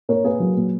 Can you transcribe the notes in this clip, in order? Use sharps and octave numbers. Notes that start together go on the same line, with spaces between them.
A#2 A#4 C#5
A#3 G#4 B4
F#3
A#2